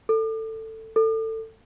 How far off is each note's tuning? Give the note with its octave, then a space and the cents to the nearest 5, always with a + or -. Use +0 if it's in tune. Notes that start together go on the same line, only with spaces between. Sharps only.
A4 +15
A4 +20